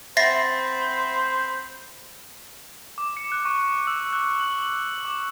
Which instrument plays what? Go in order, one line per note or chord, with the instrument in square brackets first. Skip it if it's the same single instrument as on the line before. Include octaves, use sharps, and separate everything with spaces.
[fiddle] C4 B5 [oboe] C5 [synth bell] E5 F#5 [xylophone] A6 A#6 C7
[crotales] D6
C#7
F#6
C#6
E6
F#6
F#7
F#7
D6